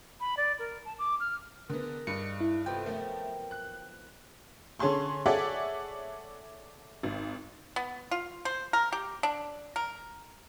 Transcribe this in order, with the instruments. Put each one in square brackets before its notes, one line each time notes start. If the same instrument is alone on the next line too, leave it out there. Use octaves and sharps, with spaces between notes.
[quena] B5
D5
A#4
A5
D6
F6
[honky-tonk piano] D3 B3 [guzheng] G#4 [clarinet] A#4
[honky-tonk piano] G2 [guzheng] D#4 D5 [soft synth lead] C#7
[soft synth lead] E4
[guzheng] C3 B3 A4 [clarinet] F4 [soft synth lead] G5
[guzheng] F3 F#3 [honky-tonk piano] A3 [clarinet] A#4
[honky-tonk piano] F#6
D3 C#4 G#4 A5 C6 C#6
G#4 A4 C#5 D5 E5 F#5
G#1
[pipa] B3
F4
C5
A#4
G4
D4
A#4